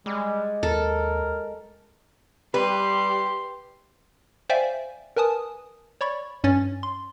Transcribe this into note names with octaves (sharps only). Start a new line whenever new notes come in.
G3 G#3
D#2 A4 A#4
G3 G4 B4 C6
C5 D5 E5 F5 G5 G#5
A#4 B4 G#5 A5 D#6
C#5 D5 B5 C#6
G2 C#4 C#5 A6
C6